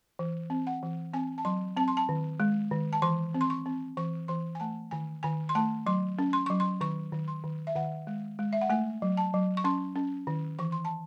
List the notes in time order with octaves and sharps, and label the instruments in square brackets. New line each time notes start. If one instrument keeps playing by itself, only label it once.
[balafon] E3
C4
F#5
E3
C4 G#5
A5
F#3 C6
C4 A5
C6
A5
D#3
G#3
D#3
A5
E3 C6
C4
C6
C#6
C4
E3 C#6
E3 C6
G#5
A3 A5
D#3 G#5
D#3 G#5
C6
A3 A5
F#3 C6
C#4
C6
F#3 C#6
C6
D#3 C#6
D#3
C6
D#3
E5
D#3 F#5
G#3
G#3
E5
F#5
A3 G#5
F#3
A5
F#3
C#6
C#4 C6
C#4
D#3
E3 C#6
C6
A5